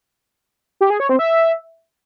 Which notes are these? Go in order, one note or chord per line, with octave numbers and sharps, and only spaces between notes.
G4
G#4
C#5
C4
E5